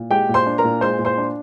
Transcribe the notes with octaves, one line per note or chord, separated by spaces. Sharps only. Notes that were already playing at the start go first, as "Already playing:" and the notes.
Already playing: A#2
G#3 G4 G5
A#2
C5 C6
D4
A#4 A#5
A#2
G#3 C5 C6
A#2
C5 C6
D4